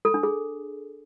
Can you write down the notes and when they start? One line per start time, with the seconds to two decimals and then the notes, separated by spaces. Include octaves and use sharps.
0.05 A4
0.14 D4
0.23 G#4